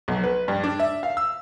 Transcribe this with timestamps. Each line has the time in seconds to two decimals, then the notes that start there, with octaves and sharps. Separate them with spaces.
0.08 B1
0.24 B4
0.48 G2
0.64 D4
0.80 E5
1.03 F5
1.17 E6